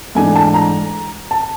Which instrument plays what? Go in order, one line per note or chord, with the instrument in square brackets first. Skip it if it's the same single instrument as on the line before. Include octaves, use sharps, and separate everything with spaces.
[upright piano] G#2 E3 A3 D4 G#5
A5
A#5
A5